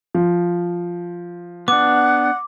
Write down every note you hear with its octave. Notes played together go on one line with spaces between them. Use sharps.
F3
B3 D4 F#5 D6